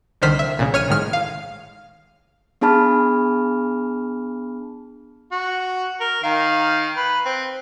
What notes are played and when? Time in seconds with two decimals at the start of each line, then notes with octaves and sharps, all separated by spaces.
0.22 C2 D3 D#3 C5 F6 B6
0.39 E5
0.57 C2 A#2 C#3
0.73 A#1 C#5 F6 D#7
0.89 G#1 A2 D#3 G#3 F6
1.13 F5
2.61 B3 D4 G#4 A5 B5 F6
5.32 F#4
6.01 A#4
6.23 D#3 F5
6.97 B4
7.25 C4